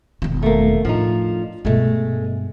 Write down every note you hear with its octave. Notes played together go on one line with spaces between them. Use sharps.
E1 D#3
A3 A#3
A2 F3 D4 D#4
G2 B2 G#3 A3